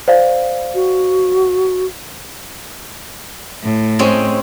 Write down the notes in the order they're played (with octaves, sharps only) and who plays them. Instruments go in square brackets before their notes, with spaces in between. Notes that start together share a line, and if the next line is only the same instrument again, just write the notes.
[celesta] C5 D5 F5
[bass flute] F#4
[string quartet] A2
[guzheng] G#3 C4 C#4